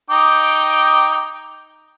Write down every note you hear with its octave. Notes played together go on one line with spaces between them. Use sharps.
D#4 G5 D6